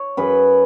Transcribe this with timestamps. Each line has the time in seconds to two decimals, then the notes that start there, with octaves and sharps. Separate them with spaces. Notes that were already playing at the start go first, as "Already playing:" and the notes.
Already playing: C#5
0.17 F#2 G#4 B4